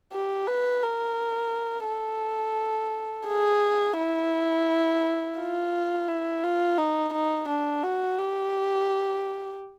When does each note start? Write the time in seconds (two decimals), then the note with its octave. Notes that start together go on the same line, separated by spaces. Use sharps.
0.13 G4
0.47 B4
0.83 A#4
1.88 A4
3.28 G#4
3.98 E4
5.38 F4
6.08 E4
6.43 F4
6.78 D#4
7.14 D#4
7.48 D4
7.83 F#4
8.19 G4